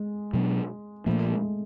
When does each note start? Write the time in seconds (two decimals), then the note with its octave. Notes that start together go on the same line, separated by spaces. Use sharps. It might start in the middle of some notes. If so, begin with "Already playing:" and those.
Already playing: G#3
0.34 B2 F#3 B3 D4
1.06 A#2 F3 A3 A#3
1.31 G#3